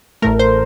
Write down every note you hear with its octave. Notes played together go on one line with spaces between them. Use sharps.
A1 A2 A3 A#4
C5